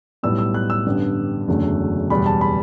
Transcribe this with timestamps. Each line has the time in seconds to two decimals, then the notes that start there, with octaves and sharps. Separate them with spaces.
0.23 B1 A2 G3 B3 E6
0.39 E6
0.54 F#6
0.70 E6
0.86 A1 G2 D3 G3 B3
1.48 F#1 E2 D3 F#3 A3
2.10 F#1 E2 B2 G3 B3 B5
2.26 A5
2.41 B5